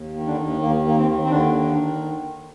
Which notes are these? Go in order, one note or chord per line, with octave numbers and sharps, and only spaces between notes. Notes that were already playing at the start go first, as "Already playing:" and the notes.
Already playing: D#2
D#3
D3 D4
D#2
D#2 A#3
D#3 A#3
C4
D#3
C4
D#2 D3 D4
D#3